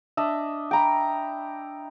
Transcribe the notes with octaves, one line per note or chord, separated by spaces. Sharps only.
D4 D#5 E5
G5 A#5 B5